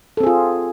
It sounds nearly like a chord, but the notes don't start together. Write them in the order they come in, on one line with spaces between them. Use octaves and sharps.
A4 C4 G#4 F4